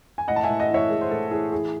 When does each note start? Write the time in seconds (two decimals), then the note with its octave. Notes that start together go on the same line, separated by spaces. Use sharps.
0.18 G#5
0.28 A2 D#5 F#5
0.36 A5
0.44 A2 E5 G#5
0.60 D#5 F#5
0.70 E3 C#5 E5
0.90 A2 G#4
1.01 C5
1.11 A2 A4
1.31 E3 G#4
1.52 E3 G#4